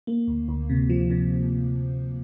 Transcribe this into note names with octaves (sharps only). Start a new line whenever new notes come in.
A#3
D2
D2
C3
F3
C3